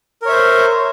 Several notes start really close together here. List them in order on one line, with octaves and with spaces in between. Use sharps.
A#4 C#5 E5 C5